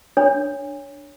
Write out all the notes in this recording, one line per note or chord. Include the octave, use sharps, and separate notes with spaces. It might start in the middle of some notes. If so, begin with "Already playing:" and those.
D4 C#5